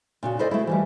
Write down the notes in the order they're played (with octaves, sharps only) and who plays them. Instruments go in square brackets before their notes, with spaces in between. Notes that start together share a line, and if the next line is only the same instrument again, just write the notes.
[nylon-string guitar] A#2 C#3 F#4
E4 G#4 A4 C5 D5 D#5
A3 E4
E3 F3 G3